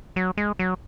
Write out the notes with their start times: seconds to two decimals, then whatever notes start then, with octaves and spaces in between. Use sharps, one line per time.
0.16 F#3
0.37 G#3
0.59 F#3